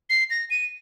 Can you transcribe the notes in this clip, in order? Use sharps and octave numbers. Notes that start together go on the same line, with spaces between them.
C7
A#6
D#7